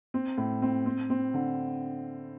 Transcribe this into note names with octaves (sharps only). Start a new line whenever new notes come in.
C4
A2
C4
C4
C4
D3